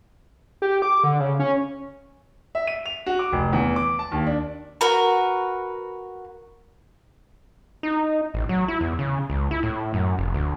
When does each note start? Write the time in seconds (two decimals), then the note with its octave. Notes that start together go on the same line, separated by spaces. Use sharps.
0.62 G4
0.82 D6
1.04 D3
1.20 C#3
1.39 C#4
2.55 E5
2.67 D#7
2.86 F7
3.06 F#4
3.19 D6
3.32 F1
3.53 E2
3.76 D6
3.99 A5
4.12 D#2
4.27 D4
4.81 F#4 A#4 B4
7.83 D#4
8.34 A1
8.49 F#3
8.68 E4
8.81 E2
8.99 C#3
9.30 C#2
9.51 E4
9.63 A2
9.94 F#2
10.19 F1
10.34 D2